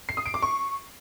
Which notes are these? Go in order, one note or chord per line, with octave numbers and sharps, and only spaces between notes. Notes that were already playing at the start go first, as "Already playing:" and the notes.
C7
D#6
D7
D6
C#6